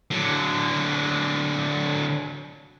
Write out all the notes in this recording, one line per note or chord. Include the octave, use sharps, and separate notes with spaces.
D3 F#3